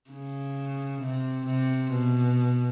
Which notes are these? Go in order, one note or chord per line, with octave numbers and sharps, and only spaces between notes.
C#3
C3
C3
B2